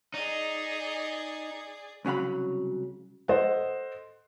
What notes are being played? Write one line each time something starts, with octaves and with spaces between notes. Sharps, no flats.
D#4 G#4 D5
C2 C#3 F#3 F5 B5
A4 C5 D#5 F#5